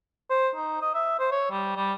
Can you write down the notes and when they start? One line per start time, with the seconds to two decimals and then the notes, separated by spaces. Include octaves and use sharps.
0.30 C5
0.55 D#4
0.82 D#5
0.94 E5
1.19 C5
1.32 C#5
1.51 G3
1.76 G3